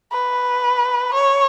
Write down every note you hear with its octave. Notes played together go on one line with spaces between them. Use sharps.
B4
C#5